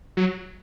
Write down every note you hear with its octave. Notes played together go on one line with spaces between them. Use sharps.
F#3